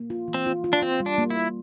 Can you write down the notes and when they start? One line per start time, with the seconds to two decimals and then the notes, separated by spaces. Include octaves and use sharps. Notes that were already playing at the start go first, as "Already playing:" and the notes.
Already playing: A#3
0.10 F4
0.28 E3
0.34 C4
0.46 F4
0.64 F4
0.73 D4
0.82 C4 F4
1.00 G3
1.06 D4
1.18 A#3
1.30 E4
1.37 A#3